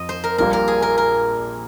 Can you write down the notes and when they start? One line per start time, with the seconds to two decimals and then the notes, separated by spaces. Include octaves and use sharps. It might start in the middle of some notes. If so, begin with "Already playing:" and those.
Already playing: F2 D#5
0.09 C5
0.24 A#4
0.38 A#1 A#2 G3 A#3 A#4
0.53 A#4
0.68 G#4
0.82 A#4
0.98 A#4